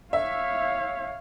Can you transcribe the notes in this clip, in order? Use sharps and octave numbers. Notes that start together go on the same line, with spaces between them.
C#5 E5 F5